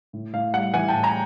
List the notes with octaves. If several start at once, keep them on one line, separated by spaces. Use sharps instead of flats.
A2
A2 F5
G3 F#5
E3 F#5 G#5
A2 G5 A5
G#5 A#5